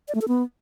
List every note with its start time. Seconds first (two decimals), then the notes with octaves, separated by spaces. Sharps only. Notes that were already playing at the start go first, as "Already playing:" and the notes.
0.08 D5
0.15 A3
0.21 A4
0.28 B3